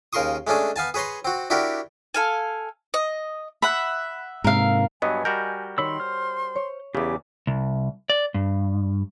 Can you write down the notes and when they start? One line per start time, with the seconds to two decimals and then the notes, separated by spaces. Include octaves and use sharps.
0.13 D#2 C#3 A#4 C6 C#6 D#6
0.47 G#3 A3 C#4 D4 G#4
0.76 B3 F5 G#5 A5
0.94 G#4 B4 C#5 A#5 C6
1.25 C4 F#4
1.50 D4 E4 F#4 G4 A#4
2.14 A4 F5 G#5
2.94 D#5
3.62 E5 F#5 B5
4.44 G#2 C3 A#4 F5
5.02 G2 F#3 B3 D#5 G#5
5.25 G3 F#4 A#4 G6
5.78 D#3 C#5 B5 C6 E6
6.00 C5 F6
6.56 C#5
6.95 E2 C#3 G4 D6
7.47 C2
8.10 D5
8.34 G2